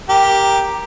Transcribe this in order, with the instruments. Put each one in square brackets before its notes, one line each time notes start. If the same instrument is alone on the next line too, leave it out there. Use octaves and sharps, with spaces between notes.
[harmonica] G4 A#4